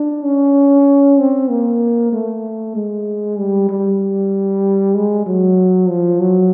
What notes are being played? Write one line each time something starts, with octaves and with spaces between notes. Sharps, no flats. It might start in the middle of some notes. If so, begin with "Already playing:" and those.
Already playing: D4
C#4
C4
A#3
A3
G#3
G3
G3
G#3
F#3
F3
F#3